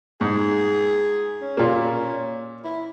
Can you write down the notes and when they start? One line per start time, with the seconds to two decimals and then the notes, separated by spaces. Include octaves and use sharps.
0.21 G#2 G#4
1.42 C#4
1.57 A#2 A#3
2.64 E4